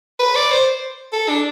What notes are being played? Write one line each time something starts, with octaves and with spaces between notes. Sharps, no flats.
B4
D5
C5
A4
D4